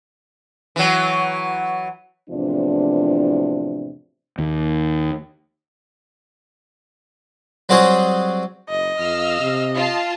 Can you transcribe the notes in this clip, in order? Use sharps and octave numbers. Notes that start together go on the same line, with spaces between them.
E3 F#3
E2 A2 C3 F3 D4
D#2
F#3 G3 C4 F#4 G#4
F#1 D#5
F2 F5 E6 F6
C3
F4 A5